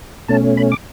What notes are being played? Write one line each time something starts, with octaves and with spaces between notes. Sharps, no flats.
B2 A3 C#4 A5
B5
D6